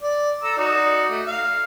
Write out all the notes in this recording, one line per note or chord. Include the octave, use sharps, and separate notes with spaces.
D5
A4 A#5 E6
D#4 F#4 D5
A3
F5